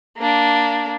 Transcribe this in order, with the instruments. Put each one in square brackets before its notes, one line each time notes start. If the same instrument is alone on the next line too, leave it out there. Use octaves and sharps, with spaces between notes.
[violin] A#3 D4